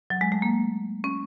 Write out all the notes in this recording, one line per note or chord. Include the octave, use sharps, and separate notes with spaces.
F#3
G#3
A3
A#3
C#4